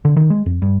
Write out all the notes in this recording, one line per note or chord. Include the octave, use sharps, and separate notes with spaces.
D3
D#3
G#3
F2
G2